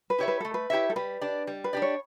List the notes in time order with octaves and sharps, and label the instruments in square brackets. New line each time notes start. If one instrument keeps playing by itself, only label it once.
[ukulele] B4
[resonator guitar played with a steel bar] E4 G4 C#5 E5
[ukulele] B4
[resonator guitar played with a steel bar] A3 [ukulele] A4
[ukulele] B4
[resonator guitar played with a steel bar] E4 G4 C#5 E5
[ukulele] A4
[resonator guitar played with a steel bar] G3 [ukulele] B4
[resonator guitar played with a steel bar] D4 G4 D5
G3
[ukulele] B4
[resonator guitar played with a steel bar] D4 G4 D5
[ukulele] C#5